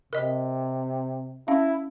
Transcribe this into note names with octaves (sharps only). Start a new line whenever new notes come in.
C3 A#4 D#5
C#4 E4 F5